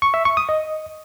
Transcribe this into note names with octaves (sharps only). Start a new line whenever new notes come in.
C#6
E5
C#6
D#6
D#5